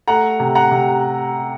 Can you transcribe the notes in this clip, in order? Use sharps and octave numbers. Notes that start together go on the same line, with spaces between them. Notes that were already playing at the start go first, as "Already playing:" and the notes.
A3 F#5 A#5
C3
F#5 A#5
C3